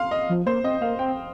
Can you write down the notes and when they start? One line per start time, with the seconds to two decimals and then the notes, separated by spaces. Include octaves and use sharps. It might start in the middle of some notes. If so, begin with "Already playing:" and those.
Already playing: F5 C6
0.11 D#5
0.29 F3
0.46 A#3 C5
0.64 C4 D#5
0.81 A#3 F5
0.99 C4 G5